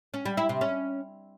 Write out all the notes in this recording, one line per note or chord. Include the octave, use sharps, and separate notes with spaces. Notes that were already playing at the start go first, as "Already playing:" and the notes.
C#4
G3
E4
C3
C#4